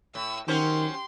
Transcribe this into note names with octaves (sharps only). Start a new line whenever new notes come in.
A2 E6
D#3 F#3 C#4 G4 C5 C6